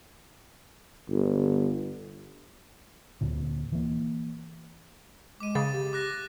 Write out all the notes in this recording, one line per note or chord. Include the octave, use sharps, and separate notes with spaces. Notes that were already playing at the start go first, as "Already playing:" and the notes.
G1
D2 A#2 D3
E3 A#3
G#3 D6 D#7
C#3 A6
G4
D6 F#6 A#6